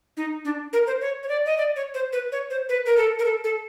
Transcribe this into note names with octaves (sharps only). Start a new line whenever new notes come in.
D#4
D4
A#4
C5
C#5
C#5
D5
D#5
D5
C#5
C5
B4
C#5
C5
B4
A#4
A4
A#4
A4
A4